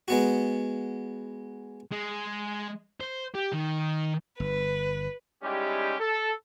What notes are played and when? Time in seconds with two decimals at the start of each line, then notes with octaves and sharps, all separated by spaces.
0.08 G#3 B3 F#4
1.91 G#3
3.01 C5
3.35 G4
3.53 D#3
4.40 G1 B4
5.43 G3 G#3 C#4 D#4 E4 G4
6.00 A4